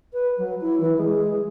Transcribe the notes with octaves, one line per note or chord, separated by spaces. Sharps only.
B4
F#3
E4
E3
G#3